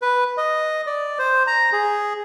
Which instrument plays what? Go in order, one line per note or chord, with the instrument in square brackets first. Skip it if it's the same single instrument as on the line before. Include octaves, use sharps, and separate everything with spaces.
[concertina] B4
D#5
D5
C5
A#5
G#4